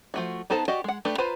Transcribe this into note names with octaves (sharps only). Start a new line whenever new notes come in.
F3 A3 F#4
B3 D#4 A4 C5 A5
F#4 G4 D5 D#5
G#3 F#5
A3 D4 G4 B4
F4 B4 C5 A#5